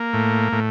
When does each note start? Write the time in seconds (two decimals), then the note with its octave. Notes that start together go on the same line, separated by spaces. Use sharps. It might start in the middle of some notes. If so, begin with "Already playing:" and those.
Already playing: A#3
0.13 A2
0.53 A2